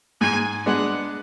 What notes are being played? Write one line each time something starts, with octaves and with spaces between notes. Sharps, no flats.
G#2 G#5
G#3 B3 D4 F#5